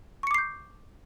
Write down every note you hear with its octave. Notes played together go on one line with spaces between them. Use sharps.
C#6 D6 G6 C7 C#7